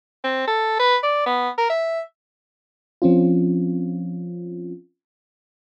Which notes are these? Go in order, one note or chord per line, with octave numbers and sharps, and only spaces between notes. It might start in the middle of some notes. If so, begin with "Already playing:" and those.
C4
A4
B4
D5
B3
A#4
E5
F3 C4 C#4 F4